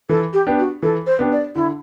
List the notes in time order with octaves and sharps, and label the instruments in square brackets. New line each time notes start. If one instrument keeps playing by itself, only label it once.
[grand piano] E3 [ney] A4
[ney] G4
[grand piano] B3 D4 G4
[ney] F#4
[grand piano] E3 [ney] A4
[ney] C5
[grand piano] B3 D4 G4
[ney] D5
[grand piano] D3 [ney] E4